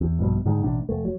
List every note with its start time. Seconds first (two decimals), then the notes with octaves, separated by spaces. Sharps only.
0.01 E2
0.19 A#1 G2 B2
0.45 G#2 D3 D#3 G#3
0.63 A1 B2 D4
0.89 F1 A3
1.05 F#3